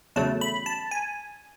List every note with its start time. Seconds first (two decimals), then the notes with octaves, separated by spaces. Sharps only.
0.16 E2 C#3 F#3 A3 A5
0.41 B5
0.66 A5
0.91 G#5